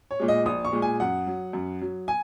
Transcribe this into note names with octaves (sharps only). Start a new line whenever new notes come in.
C#5
A#2 G#3
D#5
A#1 D#6
C#6
A#2 G#3
G#5
F#2 F#5
F#3
F#2
F#3
G#5